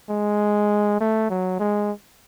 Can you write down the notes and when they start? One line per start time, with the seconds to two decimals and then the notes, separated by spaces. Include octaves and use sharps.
0.10 G#3
1.00 A3
1.30 F#3
1.60 G#3